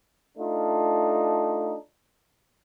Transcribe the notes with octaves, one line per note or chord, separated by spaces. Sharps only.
A3 D4 D#4 F4